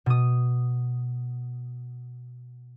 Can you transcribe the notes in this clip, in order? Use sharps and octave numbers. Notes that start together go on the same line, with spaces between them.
B2 D#6